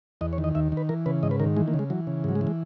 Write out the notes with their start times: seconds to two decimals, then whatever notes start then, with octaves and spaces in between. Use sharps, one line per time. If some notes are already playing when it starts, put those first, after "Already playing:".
0.21 E2 D#5
0.33 C#5
0.38 D#3
0.44 D#5
0.55 D#2 E5
0.72 D#3
0.77 B4
0.89 E3 A#4
1.06 C#3 B4
1.23 G#2 D#5
1.31 B4
1.40 D#3 A#4
1.56 E3 G#3
1.68 A#3
1.74 C#3
1.79 G#3
1.90 E3 F#3
2.07 C#3
2.24 G#2 F#3
2.35 G#3
2.41 E3
2.47 G#3